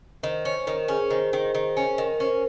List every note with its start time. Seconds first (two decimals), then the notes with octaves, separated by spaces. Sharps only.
0.23 D#3 C5
0.45 C#4 C5
0.66 D#3 A#4
0.88 C#4 G#4
1.10 D#3 C5
1.33 D#3
1.55 D#3 C5
1.77 C#4
1.98 D#3 A#4
2.20 C#4 C5